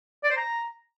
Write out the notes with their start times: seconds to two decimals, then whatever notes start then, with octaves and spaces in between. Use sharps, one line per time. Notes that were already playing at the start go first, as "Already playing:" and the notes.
0.24 D5
0.30 C5
0.37 A#5